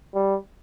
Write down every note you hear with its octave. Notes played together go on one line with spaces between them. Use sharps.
G3